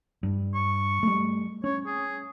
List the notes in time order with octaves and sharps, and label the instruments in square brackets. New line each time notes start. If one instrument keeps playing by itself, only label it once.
[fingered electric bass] G2
[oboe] C#6
[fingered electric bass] G3 A3
[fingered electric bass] C#4 [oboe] C#5
[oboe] G#4